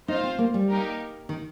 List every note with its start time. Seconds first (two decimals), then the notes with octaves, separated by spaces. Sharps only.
0.08 D#4 F4 C5 F5
0.23 C4
0.39 A#3
0.54 G3
0.69 A#3 D#4 G4 A#4
1.29 D#3